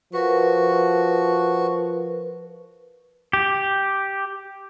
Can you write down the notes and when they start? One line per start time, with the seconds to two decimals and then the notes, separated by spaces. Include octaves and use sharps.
0.13 F3 F#4 A#4 B4
3.33 G4